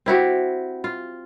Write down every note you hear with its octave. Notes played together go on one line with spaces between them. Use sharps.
C4 E4 F#4 G4
F4